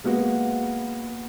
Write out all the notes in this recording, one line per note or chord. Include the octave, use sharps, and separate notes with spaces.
G#3 A#3 B3 F#4